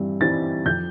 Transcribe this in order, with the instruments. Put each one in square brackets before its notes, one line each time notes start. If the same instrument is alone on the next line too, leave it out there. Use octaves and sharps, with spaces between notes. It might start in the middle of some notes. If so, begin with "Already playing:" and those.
Already playing: [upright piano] G2 E3 G3 C4
E3 G3 C4 A6
F2 G6